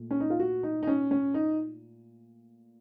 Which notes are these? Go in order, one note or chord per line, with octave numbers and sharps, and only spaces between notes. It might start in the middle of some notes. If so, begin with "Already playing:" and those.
Already playing: A#2 A3
C#4
D#4
F4
F#4
D#4
D#4
C#4
C#4
D#4